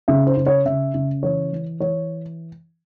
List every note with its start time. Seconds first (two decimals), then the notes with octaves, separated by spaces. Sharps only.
0.08 C#3 E5
0.27 C5
0.37 C#3
0.46 C#5
0.65 C#3 E5
0.94 C#3
1.23 E3 C#5
1.52 E3
1.80 E3 C#5